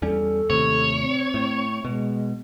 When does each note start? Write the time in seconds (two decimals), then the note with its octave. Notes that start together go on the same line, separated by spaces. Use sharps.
0.02 E2 G3 C#4 A4
0.50 D#2 A2 C3 C#5
0.98 C4
1.34 A2
1.85 B2 G#3